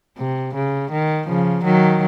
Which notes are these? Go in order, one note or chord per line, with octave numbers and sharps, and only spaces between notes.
C3
C#3
D#3
C#3 F3
D#3 F#3